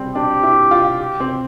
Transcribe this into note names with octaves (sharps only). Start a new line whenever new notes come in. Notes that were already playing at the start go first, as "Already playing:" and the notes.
Already playing: G3 C4
D4 G4
E4
F4
G4
C4